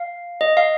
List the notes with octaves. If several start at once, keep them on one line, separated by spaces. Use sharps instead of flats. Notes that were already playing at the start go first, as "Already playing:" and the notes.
Already playing: F5
D#5
F5